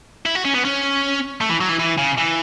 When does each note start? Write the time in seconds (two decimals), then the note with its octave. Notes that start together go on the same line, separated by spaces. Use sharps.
0.26 E4
0.35 F#4
0.45 C#4
0.54 B3
0.65 C#4
1.41 A3
1.50 E3
1.61 F#3
1.69 E3
1.79 E3
1.98 C#3
2.18 E3